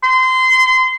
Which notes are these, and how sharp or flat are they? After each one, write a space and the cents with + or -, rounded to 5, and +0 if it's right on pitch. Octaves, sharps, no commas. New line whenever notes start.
C6 -25